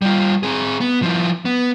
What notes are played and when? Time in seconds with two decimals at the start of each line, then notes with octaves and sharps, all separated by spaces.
0.02 G3 F4
0.43 C4 G#4
0.80 B3
1.02 F3 E4
1.45 B3